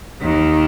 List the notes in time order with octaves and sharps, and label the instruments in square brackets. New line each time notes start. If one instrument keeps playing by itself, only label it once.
[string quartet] D#2 D#3